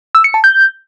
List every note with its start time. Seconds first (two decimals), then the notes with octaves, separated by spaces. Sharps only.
0.15 E6
0.24 C#7
0.34 A5
0.44 G6